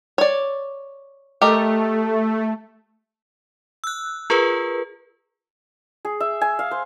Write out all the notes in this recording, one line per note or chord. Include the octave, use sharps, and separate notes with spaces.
C#5 D5
A3 G4 A#4 D#5
E6 F#6
F4 G#4 A#4 B4
G#4
E5
G#5
F5
C5